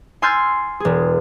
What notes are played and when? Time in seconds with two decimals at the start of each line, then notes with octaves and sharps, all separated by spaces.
0.22 G#5 C6 E6 F6 G6 A6
0.80 E1 G#4